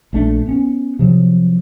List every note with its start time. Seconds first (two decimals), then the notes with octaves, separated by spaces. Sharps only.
0.13 A#1 A3 D4
0.47 B3 C#4
0.99 C3 F3 F#3